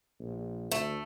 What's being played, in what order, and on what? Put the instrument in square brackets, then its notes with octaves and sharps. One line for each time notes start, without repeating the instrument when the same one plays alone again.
[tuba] A#1
[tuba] D2 [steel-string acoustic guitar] A3